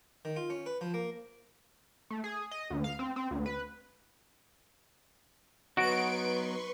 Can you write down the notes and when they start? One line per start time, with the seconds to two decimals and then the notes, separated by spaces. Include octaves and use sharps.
0.25 D#3
0.36 F4
0.50 C#4
0.66 B4
0.81 F3
0.94 A#3
2.10 A3
2.24 G#4
2.51 D#5
2.70 D2
2.84 F5
2.99 C4
3.16 C4
3.31 D2
3.46 B4
5.77 F#3 B3 D#4 F#4 B4 C6 C#6 D7